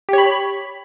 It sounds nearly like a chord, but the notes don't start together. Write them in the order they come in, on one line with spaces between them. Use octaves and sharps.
G4 C#5 B5